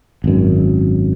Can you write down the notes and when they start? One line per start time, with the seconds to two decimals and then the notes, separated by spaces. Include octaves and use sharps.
0.24 G#1 F#2